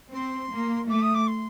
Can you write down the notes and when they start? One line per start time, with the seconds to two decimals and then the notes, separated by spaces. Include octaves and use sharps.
0.13 C4 C6
0.51 A#3
0.88 A3 D6
1.01 D#6
1.14 D6
1.27 C6